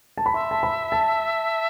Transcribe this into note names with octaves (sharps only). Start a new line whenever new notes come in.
A5
B5
E5 C6
A5
B5
A5